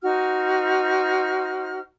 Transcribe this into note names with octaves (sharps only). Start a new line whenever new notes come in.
D#4 F#4 C5 F6